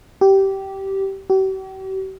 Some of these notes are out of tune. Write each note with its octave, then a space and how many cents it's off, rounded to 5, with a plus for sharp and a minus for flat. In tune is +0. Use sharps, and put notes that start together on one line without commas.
G4 -15
G4 -45